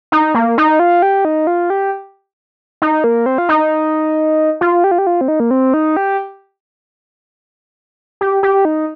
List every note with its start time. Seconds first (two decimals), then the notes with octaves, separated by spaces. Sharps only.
0.12 D#4
0.35 A#3
0.58 D#4
0.79 F4
1.02 G4
1.25 D#4
1.47 F4
1.70 G4
2.82 D#4
3.04 A#3
3.26 C4
3.38 F4
3.49 D#4
4.61 F4
4.84 G4
4.91 F4
4.98 G4
5.07 F4
5.21 C4
5.28 D#4
5.40 A#3
5.51 C4
5.74 D#4
5.97 G4
8.21 G4
8.43 G4
8.65 D#4